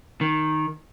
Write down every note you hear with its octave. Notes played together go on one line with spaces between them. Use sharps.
D#3